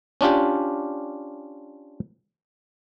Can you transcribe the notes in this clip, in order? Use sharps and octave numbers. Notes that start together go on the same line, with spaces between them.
C#4 D4 F4 G4